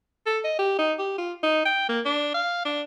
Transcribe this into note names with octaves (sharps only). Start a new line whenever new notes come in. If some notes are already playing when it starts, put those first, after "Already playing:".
A4
D#5
G4
D#4
G4
F4
D#4
G5
A#3
D4
F5
D4